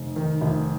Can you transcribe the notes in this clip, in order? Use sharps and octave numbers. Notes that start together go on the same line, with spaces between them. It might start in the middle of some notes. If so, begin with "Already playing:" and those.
Already playing: F1
D#3
F1